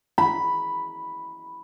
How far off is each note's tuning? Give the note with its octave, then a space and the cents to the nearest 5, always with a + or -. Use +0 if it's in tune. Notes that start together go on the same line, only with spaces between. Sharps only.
B5 +0